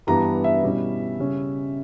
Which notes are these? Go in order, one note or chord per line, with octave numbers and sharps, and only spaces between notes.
G2 E3 G3 B3 D4 A#5
E5
B2 G3 C#4 E4
C#3 G3 C#4